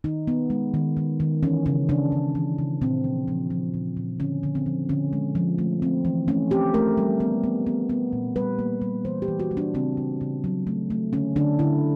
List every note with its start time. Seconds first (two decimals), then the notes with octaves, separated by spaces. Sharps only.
0.04 D#3 D#4
0.28 B3
0.50 G#3
0.74 D#3
0.97 D#3
1.20 D#3
1.43 E3 C#4
1.66 C#3 C#4
1.89 C#3 D4
2.12 C#3
2.35 E3
2.59 C#3
2.81 A#2 C4
3.04 F3
3.28 F3
3.50 F3
3.74 A#2
3.97 A#2
4.20 D3 C#4
4.43 D3
4.55 C4
4.66 F3
4.89 D3 C#4
5.13 G#3
5.35 F3
5.58 A3
5.82 C4
6.05 E3
6.28 A3 C#4
6.51 C4 G4
6.74 A3 A#4
6.98 G3
7.20 B3
7.44 B3
7.67 B3
7.89 B3
8.13 A#2
8.36 G3 B4
8.59 A#3
8.82 G3
9.05 E3 C5
9.22 G4
9.28 E3
9.40 F#4
9.51 G3
9.57 D4
9.74 C#3 C4
9.97 C#3
10.21 C#3
10.44 F#3
10.67 A3
10.90 A3
11.13 D3 C#4
11.36 D3 D4
11.59 D3 E4